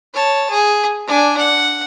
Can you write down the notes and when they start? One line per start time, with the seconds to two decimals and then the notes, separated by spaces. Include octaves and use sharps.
0.14 C#5 A5
0.50 G#4
1.07 D4 G#5
1.38 F#5